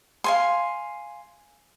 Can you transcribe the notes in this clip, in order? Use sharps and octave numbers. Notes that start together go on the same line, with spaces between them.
F5 G#5 C6